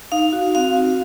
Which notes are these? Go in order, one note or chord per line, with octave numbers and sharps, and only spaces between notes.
D#4 F5
F#4
C4 F5
F#4